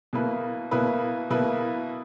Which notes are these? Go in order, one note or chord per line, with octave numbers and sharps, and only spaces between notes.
B2 A#3 E4 B4
B2 A#3 E4 B4
B2 A#3 E4 B4